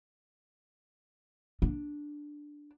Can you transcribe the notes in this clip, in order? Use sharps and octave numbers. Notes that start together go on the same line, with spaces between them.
D4